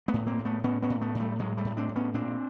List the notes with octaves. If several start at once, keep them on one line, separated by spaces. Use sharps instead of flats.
A3 B3
A2
A#3 C4
A2
A3 B3
A2 B3 C#4
B3 C#4
A2
A3 B3
A2
G3 A3
A2 F#3 G#3
G3 A3
A2
C4 D4
A2
B3 C#4
A#2 C4 D4